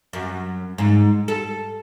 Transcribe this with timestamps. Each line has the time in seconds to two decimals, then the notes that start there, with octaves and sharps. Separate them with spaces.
0.13 F#2
0.78 G#2
1.28 A4